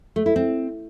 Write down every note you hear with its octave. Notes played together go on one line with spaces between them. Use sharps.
A3
E4
C4